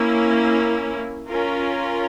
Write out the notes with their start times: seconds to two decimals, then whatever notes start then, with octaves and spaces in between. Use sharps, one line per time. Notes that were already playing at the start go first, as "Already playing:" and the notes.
Already playing: A#3 C#4 E4
1.29 C#4 F4 A#4